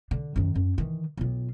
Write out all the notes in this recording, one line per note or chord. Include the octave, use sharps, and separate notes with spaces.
D3
F#2 D#3
F#2
D#3 E3
B1 F4